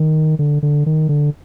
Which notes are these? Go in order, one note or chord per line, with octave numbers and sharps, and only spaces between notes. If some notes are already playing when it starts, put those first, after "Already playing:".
Already playing: D#3
D3
D3
D#3
D3